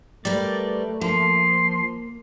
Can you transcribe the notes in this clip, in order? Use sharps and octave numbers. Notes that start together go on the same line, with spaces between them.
G3 A3 A#4 B4 D5
F3 A#3 C6